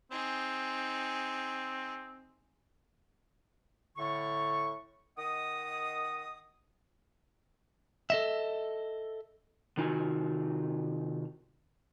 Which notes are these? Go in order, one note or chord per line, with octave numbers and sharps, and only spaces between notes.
C4 D#4 G#4
A2 D3 E4 C#6
D#3 D#5 F#5 D#6
A4 D#5 E5
C3 D#3 D#4 F4 F#4 G#5